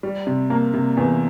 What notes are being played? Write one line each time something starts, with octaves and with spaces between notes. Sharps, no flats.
G3
C3
A#3
C3
E2